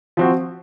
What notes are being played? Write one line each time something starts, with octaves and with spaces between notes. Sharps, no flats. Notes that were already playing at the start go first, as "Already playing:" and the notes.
F3 C4 F#4